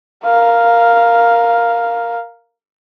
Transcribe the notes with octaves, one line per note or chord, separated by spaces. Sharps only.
A#4 F5